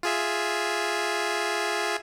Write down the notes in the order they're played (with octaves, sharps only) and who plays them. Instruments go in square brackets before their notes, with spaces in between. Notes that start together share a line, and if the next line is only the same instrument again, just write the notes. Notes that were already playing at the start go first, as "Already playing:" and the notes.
[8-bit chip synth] F4 G#4 E5